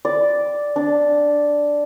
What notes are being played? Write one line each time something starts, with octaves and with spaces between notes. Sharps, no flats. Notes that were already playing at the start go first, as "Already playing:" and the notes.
D5
D4